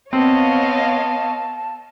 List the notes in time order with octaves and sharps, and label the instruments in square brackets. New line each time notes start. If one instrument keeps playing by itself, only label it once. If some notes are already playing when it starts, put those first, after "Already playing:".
[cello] B3 D#5 [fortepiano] C4 [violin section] C#5 F5 [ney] A5